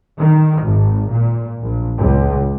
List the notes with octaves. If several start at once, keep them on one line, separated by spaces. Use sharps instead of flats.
D#3
G#1
A#2
A#1
C#2